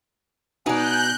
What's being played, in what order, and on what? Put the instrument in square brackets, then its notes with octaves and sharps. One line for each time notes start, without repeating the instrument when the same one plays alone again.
[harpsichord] B2 [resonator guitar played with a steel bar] D#4 D5 [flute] G#5 [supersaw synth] F#6 G6